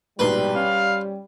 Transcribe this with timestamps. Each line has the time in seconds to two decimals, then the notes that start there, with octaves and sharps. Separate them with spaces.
0.19 A#1 G#2 B2 G3 B4 C6
0.56 C#4 F5